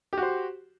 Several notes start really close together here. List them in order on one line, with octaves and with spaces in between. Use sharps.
G4 F#4 C5